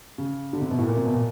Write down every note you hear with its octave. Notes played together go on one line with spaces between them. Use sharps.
C#3
D3
C3
B2
A2
A#2
C3
B2
A#2